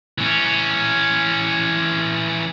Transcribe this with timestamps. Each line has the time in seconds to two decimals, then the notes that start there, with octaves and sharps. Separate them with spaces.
0.18 E3 C#4